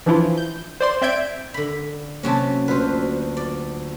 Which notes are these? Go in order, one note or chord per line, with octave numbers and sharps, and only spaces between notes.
E3 F3 D4 E4 F4
G6
C5 D5 C6
C4 D5 E5 G6 G#6 D7
D3 B5
C3 F#3 A#3 C#4 A5
D2 D3 F4 B4 C5
D5